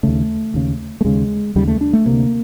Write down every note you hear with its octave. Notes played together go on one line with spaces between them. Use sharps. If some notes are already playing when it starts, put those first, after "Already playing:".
D#2 C#3 A3
D#2 C#3
A3
D#2 C#3 G#3
D#2 C#3 G3
A3
D4
A3
D2 C3 A#3